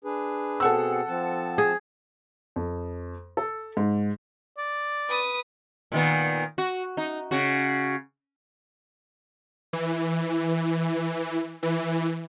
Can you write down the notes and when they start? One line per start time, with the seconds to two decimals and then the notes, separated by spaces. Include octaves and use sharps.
0.05 D4 G#4 B4
0.60 B2 C4 G#4 A4 F#5 E6
1.08 F3 C4 A5
1.58 G#4
2.56 F2
3.37 A4
3.77 G#2
4.58 D5
5.09 B4 D#6
5.92 A#2 D#3 B3
6.58 F#4
6.97 D#4
7.31 C#3 F#4
9.73 E3
11.63 E3